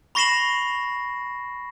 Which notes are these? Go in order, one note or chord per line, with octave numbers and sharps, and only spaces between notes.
B5 C#6 A#6 C7 E7 F#7